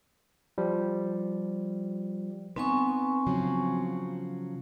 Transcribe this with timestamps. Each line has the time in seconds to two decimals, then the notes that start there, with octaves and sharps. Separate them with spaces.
0.58 F3 G3
2.56 B3 C4 D#4 B4 G#5 C#6
3.27 C#3 F3 F#3